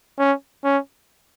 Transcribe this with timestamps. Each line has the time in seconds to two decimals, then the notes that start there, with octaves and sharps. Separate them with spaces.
0.19 C#4
0.64 C#4